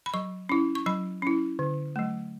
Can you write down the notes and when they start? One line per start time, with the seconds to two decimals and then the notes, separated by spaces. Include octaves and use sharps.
0.06 B5
0.14 F#3 C#6
0.49 C#4 E4
0.75 C#6
0.86 F#3 B5
1.22 C#4 E4
1.59 D3
1.96 F#3 A3